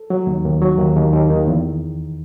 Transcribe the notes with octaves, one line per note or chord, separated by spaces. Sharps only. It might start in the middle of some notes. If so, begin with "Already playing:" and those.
Already playing: A4
F#3
D#2
D#2
F#3
D#2
D#2
D#2
D#3
E2